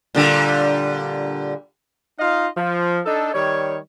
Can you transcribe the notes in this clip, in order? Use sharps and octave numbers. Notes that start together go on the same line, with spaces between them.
A#2 D3 G3
D#4 F4 D#5 F5
F3
D4 D#4 A4
D#3 G3 C#5